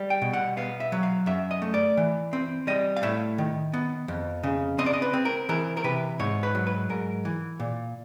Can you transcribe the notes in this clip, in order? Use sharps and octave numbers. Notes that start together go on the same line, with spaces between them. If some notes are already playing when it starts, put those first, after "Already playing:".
Already playing: G3
G5
B2
F#5
B3 F5
E5
F#3
F5
F#2 E5
D#5
A3
D5
E3
C4
G3 D#5
F5
A2 E5
D#3
B3
F2
C#3
C4 D#5
D5
D#5
B4
C4
A#4
E3 A#4
A#4
C3 B4
G#2 C#5
B4
F#3
B4
G#2 A#4
E3
A#2